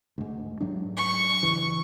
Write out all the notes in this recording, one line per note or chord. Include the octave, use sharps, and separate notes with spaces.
D2 G#2
G#2 F#3 D4
C#6
C#2 E3